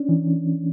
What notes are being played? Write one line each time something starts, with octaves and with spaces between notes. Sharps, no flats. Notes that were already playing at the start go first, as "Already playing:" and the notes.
Already playing: C#4 D4
E3